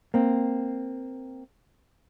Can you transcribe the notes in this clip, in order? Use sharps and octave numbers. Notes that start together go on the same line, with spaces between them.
A#3 C4